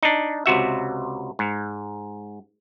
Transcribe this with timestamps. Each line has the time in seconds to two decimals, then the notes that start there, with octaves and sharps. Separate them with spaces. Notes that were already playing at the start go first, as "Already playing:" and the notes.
0.03 D4 D#4
0.46 C#2 C3 F#4 E5
1.39 G#2